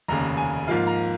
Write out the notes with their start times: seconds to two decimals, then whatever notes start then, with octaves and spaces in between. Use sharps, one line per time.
0.08 F1 D#2 C#3 A#5
0.37 G#5
0.67 G#2 F3 A#3 F4 F5
0.87 A#5